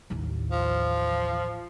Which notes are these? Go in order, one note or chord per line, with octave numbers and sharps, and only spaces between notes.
A1 D#2
F3